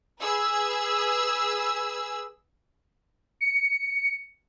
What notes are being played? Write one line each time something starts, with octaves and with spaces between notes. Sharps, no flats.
G#4 B4 E6
C#7